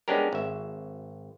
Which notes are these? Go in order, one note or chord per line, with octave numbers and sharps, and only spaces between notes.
G#3 B3 C#4 D4 G4 A#4
G#1 E5